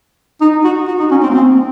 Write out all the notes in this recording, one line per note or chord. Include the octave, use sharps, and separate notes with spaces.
D#4
F#4
F#4
D#4
C#4
C4
A#3
C4